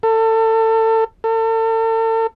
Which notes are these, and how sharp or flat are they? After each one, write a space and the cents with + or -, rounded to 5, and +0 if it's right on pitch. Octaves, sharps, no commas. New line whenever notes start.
A4 +30
A4 +40